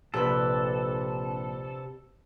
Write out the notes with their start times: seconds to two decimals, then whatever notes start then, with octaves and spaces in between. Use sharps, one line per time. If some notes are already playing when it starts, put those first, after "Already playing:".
0.14 A#1 C3 D4 A4 B4